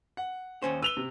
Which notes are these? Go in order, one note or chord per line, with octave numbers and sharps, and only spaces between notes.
F#5
D#2 C#4 C5
B4 E6 F7 G7
C3